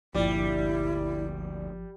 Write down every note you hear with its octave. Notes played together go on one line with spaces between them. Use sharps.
G1 D2 A#2 D3 F3 G3 E4 D5